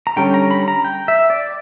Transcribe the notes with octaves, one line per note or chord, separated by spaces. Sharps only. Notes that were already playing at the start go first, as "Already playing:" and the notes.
A#5
D3 G3 C#4 G5
A#5
B5
A#5
G5
E5
D5